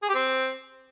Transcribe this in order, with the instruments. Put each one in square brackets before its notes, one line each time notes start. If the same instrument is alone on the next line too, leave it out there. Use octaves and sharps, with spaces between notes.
[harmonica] G#4
G4
C4